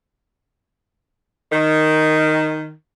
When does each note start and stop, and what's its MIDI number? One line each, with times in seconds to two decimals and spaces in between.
1.51 2.72 51